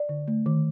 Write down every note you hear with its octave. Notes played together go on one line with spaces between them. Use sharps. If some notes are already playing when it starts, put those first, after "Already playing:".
Already playing: D5
D3
A3
D#3